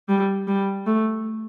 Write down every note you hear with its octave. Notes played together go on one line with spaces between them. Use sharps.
G3
G3
A3